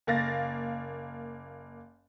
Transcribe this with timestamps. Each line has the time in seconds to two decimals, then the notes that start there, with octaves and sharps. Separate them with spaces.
0.07 F#1 A#3 F5 A6 A#6